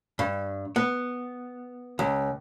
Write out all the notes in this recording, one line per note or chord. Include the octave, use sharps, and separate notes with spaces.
G2
B3
C#2